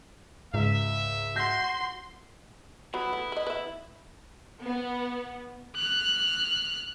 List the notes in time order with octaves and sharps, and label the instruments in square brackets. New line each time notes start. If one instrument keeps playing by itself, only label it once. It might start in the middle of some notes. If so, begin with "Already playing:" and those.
[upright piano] C#2 [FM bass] G#2 [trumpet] E5
[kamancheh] F#4 C6 [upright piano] G6 A#6
[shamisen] F#3 G3 [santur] B3 [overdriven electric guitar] E4
[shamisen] A3
B4 D#5
B4 E5
[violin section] B3
[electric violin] F6 F#6